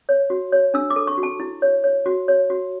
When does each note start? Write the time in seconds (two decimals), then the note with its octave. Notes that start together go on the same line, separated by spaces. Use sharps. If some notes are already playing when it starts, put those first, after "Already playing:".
0.09 C#5
0.30 F#4
0.52 C#5
0.74 D4 E6
0.90 D6
0.96 A4
1.07 C#6
1.18 F#4
1.23 A5
1.40 E4
1.62 C#5
1.84 C#5
2.06 F#4
2.28 C#5
2.50 F#4